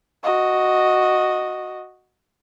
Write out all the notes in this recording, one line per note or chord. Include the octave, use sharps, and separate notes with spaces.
F#4 D#5